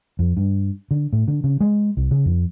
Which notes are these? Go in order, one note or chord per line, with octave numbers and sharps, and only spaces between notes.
F2
G2
D3
A2
D3
C#3
G#3
C2
C#3
F2